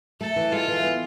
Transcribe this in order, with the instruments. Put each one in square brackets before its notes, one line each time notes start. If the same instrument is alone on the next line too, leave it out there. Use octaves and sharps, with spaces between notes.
[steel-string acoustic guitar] A3 [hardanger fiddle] A4
[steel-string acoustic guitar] E3
[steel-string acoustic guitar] G#3 [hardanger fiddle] F4
[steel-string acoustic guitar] E3
B3